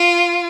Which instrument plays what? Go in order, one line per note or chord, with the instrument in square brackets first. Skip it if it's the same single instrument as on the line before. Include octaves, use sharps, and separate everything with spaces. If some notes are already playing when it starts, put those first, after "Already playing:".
Already playing: [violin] F4